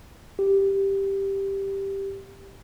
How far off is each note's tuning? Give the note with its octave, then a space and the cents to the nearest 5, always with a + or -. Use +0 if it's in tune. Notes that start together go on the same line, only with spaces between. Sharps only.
G4 +0